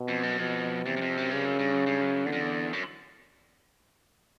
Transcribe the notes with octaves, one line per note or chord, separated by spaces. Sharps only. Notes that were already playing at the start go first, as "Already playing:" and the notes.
Already playing: B2
F2
F#2
F2 B2
E2 C3
F#2
F2
F#2
G2 C#3
F#2
G2
F#2
G2
F#2
E2 D3
F2
E2
F#2